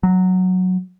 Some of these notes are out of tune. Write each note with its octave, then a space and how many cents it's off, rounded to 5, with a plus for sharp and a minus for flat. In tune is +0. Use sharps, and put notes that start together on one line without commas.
F#3 -5